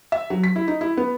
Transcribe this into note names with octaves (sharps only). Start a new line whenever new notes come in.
E5
F#3
B6
E4
D#4
E4
B3